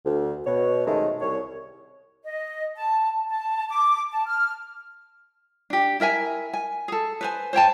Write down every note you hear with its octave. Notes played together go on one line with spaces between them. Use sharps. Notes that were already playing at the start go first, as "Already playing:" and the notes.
D2
B2 C#5
F#2 C3 D#3 G#3 A3
C2 C#5
D#5
A5
A5
D6
A5
F6
D4 G4
E4 A#4 E5 G#5
G#5
G#4 A4
B4 C5 G#5
C5 C#5 G5 A5